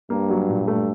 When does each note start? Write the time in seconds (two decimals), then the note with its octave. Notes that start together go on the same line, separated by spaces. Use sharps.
0.10 G2 A#3
0.30 F#3
0.49 A#2
0.68 A3